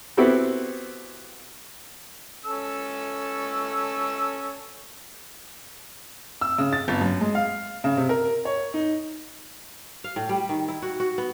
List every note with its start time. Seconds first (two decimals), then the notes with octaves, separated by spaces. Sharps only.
0.17 B3 C4 E4 F#4 G4 A4
2.45 C#4 A4 E6
6.41 E6
6.58 C#3
6.73 A6
6.88 G1
7.01 F#2
7.21 G#3
7.35 F5
7.84 C#3
7.97 C3
8.09 A#4
8.45 C#5
8.74 D#4
10.04 F5
10.16 A2
10.29 G3
10.49 D#3
10.68 E4
10.82 F#4
11.00 F#4
11.18 B3